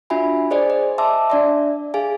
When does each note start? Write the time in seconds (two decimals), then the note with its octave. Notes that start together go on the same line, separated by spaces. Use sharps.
0.10 D4 F4 F#4 E5 G#5 B5
0.51 G#4 C5 D5 D#5 G#5
0.70 D#5
0.98 E5 A5 C6 D6 E6
1.30 D4 D5 E5
1.94 G#4 F5 G#5